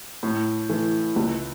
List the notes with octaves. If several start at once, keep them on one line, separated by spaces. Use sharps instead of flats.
A2
E3 A3
C#2